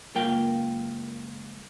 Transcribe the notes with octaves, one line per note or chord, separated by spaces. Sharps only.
C#2 F#2 A#3 F4 G5